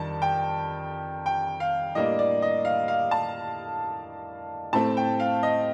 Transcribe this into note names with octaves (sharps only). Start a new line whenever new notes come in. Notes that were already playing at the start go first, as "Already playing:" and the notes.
Already playing: F2 D#3 G3 D4 A5
G5
G5
F5
A2 G3 A#3 D4 D#5
D5
D#5
F5
F5
A5
A2 A3 C4 A5
G5
F5
D#5